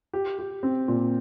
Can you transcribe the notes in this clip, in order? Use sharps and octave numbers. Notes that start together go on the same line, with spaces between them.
G4
G4
C4
A#2